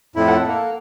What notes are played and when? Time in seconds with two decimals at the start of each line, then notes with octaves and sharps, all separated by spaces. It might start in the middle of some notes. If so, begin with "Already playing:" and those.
0.16 F2 A2 E4
0.28 A4 F#5
0.47 A#3